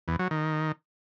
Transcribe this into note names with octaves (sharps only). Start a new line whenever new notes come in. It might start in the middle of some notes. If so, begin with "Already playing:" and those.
E2
F#3
D#3